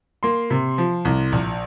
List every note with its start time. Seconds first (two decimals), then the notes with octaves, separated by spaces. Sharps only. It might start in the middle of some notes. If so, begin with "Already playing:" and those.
0.23 A#3 C6
0.50 C3
0.78 F3
1.05 C2
1.32 A#1